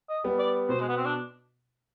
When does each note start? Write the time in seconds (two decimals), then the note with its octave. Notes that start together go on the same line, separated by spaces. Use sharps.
0.09 D#5
0.24 G3 B3
0.39 D5
0.69 B2 C5
0.81 G#3
0.88 B3
0.97 C4
1.05 D4